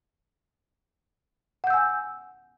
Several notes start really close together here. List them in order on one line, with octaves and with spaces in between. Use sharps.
F#5 G6 E6 G#5